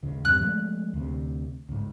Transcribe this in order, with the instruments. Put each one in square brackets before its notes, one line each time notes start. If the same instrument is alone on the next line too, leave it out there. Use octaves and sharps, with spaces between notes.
[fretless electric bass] D#1 C#2 C#3
[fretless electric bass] E2 G2 C3 [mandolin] F#6
[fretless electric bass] F3 G#3 A3
D2 C3
C#2 G#2